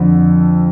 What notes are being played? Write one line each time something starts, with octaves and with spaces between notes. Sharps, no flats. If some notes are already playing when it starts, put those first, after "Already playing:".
Already playing: F2 D3 F3